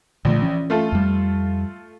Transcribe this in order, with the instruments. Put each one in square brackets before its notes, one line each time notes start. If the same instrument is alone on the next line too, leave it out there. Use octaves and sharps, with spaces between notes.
[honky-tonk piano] A#1 [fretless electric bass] A#2 D3 A3
[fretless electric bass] E3 C#4
[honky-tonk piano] A3 F4 A4
[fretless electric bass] F2 G3